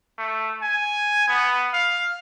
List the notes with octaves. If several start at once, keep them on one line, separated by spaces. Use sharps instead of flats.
A3
G#5
B3
F5